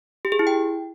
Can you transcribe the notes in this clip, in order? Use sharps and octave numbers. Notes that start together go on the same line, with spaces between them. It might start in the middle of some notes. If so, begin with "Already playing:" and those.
G4
G#4
E4
G5